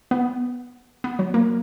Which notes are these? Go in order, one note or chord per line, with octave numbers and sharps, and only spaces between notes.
B3
B3
F#3
A#3